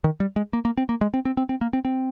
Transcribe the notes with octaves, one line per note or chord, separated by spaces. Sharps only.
D#3
G3
G#3
A#3
A#3
C4
A#3
G#3
C4
C4
C4
C4
A#3
C4
C4